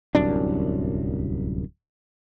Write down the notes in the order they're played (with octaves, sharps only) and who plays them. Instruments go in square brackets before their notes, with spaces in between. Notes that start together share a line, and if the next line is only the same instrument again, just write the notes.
[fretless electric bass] D1 C2 F#2 D4